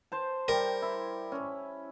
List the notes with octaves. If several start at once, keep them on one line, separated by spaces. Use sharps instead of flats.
C5 A5
G3 A#4
E4
C#4